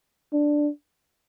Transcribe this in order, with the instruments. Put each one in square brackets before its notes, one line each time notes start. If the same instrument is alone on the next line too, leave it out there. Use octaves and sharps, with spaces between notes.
[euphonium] D4